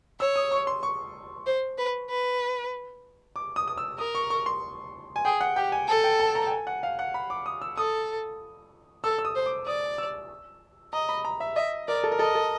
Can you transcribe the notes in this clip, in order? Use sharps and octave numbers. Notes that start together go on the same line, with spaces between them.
C#5 E6
D#6
C#6
C6
C#6
C5
B4
B4
D6
D#6
D#6
E6
A#4 D#6
C#6
C#6
C6
G#5
G#4 G5
F#5
G4 G5
G#5
A4 A5
G5
A5
A#5
G5
G#5
F#5
F5
F#5
B5
D6
D#6
E6
A4 D#6
A4 E6
E6
D#6
C5
D6
D5 D#6
E6
D#5 A#5
B5
A#5
E5
D#5 E5
A#4 D5
A4
A#4
A4 D#5
A4